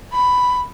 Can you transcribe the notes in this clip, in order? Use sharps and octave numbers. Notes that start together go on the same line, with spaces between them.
B5